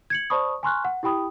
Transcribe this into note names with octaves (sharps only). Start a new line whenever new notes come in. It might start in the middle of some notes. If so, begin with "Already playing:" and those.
G#6 C#7 F#7
C5 D5 A5 B5 C#6 D#6
G#5 A#5 C6 C#6 F6 F#6
F#5
E4 G4 G5 B5 D#6